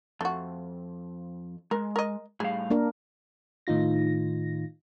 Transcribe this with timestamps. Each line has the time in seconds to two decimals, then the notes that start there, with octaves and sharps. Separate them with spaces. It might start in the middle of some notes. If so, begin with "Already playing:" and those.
0.21 F2 A3 F#4
1.71 G#3 A#4
1.96 A#4 D#5
2.40 A2 G3 G#4 F5
2.70 A#3 D4 A#4
3.67 A2 D#3 D#4 F4 A#6